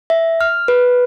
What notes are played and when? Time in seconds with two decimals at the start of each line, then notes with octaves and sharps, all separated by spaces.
0.10 E5
0.41 F6
0.68 B4